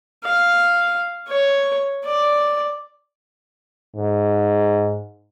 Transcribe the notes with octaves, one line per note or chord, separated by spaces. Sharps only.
F5
C#5
D5
G#2